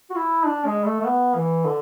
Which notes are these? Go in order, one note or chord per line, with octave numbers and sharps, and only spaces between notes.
F#4
E4
D4
G#3
A3
A3
B3
E3
D3